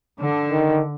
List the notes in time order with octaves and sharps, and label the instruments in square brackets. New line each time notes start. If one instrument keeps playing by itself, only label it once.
[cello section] D3
[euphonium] D#3